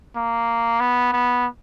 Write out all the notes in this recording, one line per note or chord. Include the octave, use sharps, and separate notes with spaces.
A#3
B3
B3